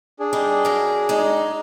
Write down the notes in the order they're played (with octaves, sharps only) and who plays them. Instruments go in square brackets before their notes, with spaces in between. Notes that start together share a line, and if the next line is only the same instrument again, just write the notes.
[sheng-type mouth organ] D4 G#4
[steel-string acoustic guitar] G3 D#4
F#3 A#4
G#3 D#4